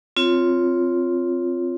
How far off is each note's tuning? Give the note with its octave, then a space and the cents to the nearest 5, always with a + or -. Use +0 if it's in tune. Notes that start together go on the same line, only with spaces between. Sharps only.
C4 +0 F4 +0 C#5 +0